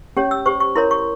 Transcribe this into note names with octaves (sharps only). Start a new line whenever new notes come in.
C#4 G4 C#5
E6
G4 C5 C#6
C#6
E4 A#4 C#5 C6
C#6